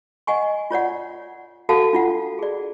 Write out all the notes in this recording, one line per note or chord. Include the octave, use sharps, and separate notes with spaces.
D#5 F#5 G#5 C#6
F4 C#5 D5 F#5
F#4 A4 F5 F#5 A5
D4 F4 F#5
G#4 D5